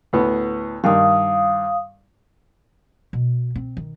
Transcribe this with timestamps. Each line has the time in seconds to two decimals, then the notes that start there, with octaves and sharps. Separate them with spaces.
0.13 D2 A2 B3
0.84 G2 D#3 F5 D#6
3.13 B2
3.55 C4
3.77 D#3